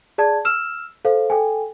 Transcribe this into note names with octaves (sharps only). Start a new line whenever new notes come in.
G#4 D5 A5 G#6
E6 F6 E7
A4 C5 F5
A4 G5 G#5